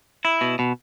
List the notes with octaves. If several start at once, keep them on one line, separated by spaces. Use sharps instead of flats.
E4
B2
B2